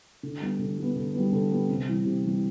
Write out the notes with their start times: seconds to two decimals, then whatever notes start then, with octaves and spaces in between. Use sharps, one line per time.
0.23 D3
0.41 G3 B3
0.59 D3
0.78 G3 B3
0.96 D3
1.14 G3 B3
1.32 D3
1.50 G3 B3
1.69 C3
1.87 E3 G3
2.05 C3
2.23 E3 G3